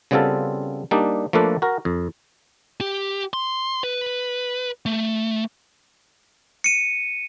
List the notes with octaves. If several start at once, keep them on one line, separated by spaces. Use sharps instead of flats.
C#3 G3 B3 C4 F4 A4
G3 A#3 D4 D#4
F3 A3 A#3 D4 A4 B4
F#4 A#4
F2
G4
C6
B4
A3
C#7 D#7